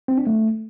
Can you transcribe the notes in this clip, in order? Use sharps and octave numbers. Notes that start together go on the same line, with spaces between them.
C4
D4
A3